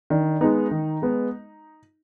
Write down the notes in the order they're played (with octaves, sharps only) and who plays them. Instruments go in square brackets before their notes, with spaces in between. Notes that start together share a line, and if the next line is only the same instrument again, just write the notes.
[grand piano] D#3 [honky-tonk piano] D4
[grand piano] G#3 B3 [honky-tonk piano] D#4
[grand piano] D#3
G#3 B3